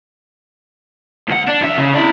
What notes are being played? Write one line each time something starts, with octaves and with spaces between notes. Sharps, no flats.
C#2 F#5
D4
F2 E5
C#3
D4 E4